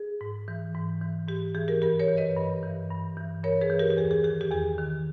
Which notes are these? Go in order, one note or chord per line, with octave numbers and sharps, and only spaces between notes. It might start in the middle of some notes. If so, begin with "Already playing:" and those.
Already playing: G#4
G#2
E3
G#2
E3
G#2 G4
E3 G#4
G4 A#4
G2 G4 A#4
A#4 C#5
E3
B4 D#5
G2
E3
G2
E3
G2 A#4 C#5
G#4 B4
E3
G4 A#4
G4
E2 G#4
G#4
D#3 G#4
G4
E2 G#4
D#3